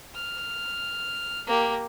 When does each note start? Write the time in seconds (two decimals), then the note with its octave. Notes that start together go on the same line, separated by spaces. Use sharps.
0.15 F6
1.47 A#3 G4